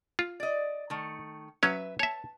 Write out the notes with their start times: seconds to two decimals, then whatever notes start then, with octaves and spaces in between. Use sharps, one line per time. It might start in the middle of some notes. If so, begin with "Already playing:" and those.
0.19 F4
0.40 D5 D#5
0.90 D#3 A3
1.63 F#3 C#4 B4 C#5 E5
1.99 C#5 E5 A5